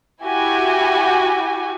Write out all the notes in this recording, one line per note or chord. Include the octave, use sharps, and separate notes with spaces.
E4 F#4 G4 G#5